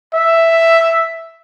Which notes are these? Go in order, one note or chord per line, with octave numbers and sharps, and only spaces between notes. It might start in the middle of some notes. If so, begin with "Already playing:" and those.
E5